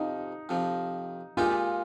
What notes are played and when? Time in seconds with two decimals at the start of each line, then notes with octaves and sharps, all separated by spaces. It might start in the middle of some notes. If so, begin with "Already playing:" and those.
Already playing: F2 C3 F3 D#4
0.49 F2 C3 F3
1.37 A#2 G#3 D#4 F4 G4